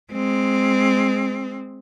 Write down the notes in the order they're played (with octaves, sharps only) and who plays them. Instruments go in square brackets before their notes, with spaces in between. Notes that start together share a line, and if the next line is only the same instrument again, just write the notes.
[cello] G#3 C4